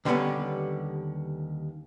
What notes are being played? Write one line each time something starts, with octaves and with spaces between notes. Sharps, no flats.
D#2 D3 G3 G#3 B3 C#4